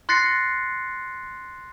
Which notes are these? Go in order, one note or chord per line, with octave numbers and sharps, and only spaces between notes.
C6 F#6 A6 A#6 C7 C#7